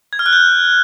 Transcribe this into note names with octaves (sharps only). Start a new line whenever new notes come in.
G#6
F6
F#6
G6